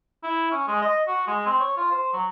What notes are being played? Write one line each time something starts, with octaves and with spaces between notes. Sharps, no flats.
E4
C#4
G#3
D#5
F#4
G#3
C4
C#5
F4
C5
F#3